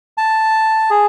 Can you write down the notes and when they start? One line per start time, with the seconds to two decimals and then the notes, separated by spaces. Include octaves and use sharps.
0.18 A5
0.90 G#4